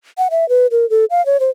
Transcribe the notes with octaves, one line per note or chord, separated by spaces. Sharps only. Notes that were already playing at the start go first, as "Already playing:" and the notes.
F#5
E5
B4
A#4
A4
F5
C#5
C5